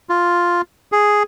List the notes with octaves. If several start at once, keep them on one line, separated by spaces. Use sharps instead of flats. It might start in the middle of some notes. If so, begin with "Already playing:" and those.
F4
G#4